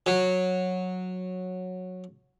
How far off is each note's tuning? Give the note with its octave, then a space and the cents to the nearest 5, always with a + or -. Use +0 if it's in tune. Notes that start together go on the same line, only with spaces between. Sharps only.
F#3 -10